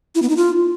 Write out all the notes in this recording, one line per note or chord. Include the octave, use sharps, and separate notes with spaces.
E4
B3
D#4
F4